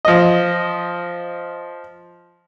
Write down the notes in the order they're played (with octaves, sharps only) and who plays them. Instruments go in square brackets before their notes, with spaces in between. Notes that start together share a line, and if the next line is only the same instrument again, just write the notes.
[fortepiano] F3 D#5